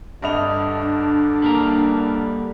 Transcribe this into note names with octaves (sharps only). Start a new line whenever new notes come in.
G2 D3 D4 D#5 F7
D4
G3 A#3 A#4